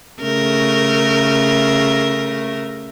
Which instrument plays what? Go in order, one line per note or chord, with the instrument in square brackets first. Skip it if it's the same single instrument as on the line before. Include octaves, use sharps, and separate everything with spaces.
[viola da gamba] C#3 A3 A#4